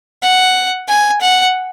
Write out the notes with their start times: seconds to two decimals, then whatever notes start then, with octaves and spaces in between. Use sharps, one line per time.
0.22 F#5
0.88 G#5
1.21 F#5